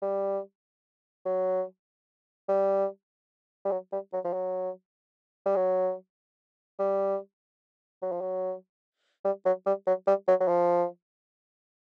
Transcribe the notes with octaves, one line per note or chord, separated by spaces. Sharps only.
G3
F#3
G3
G3
F#3
G3
F#3
F3
F#3
G3
F#3
G3
F#3
F3
F#3
G3
F#3
G3
F#3
G3
F#3
F#3
F3